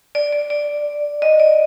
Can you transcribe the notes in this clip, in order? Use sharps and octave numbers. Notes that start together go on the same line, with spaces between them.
D5
D5
D5
D#5
D5